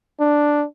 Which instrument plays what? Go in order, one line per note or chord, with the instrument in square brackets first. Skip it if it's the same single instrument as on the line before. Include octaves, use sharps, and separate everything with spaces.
[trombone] D4